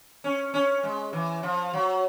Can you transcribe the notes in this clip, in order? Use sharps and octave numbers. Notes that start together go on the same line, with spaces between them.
C#4
C#4
G#3
E3
F3
F#3